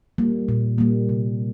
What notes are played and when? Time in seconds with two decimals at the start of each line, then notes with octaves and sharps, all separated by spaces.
0.18 G3 A#3
0.48 A#2
0.78 G3 A#3
1.09 C3